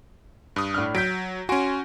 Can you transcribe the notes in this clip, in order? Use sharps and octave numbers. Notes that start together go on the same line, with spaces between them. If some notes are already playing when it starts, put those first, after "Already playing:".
G2 D#6
A2 D4 F6
F#3 G6 B6 D7
C#4 F#4 G#5 C6 D7